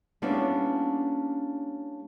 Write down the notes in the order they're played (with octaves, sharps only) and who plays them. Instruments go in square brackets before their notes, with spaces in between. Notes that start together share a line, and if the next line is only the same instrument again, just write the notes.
[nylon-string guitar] G3 A#3 B3 C#4 D4 E4